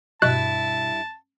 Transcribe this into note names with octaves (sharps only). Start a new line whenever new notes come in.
G2 B2 E4 A5 F#6